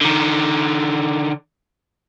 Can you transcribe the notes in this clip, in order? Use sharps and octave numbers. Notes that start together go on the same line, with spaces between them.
D3 D#3